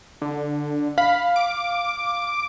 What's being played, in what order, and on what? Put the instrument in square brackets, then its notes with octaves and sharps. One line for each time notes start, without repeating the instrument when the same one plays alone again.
[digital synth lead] D3
[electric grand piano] F5 [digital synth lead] B5
[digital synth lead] D6